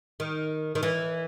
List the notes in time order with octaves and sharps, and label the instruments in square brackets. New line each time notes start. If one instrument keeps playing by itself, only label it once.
[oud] D#3
D#3
E3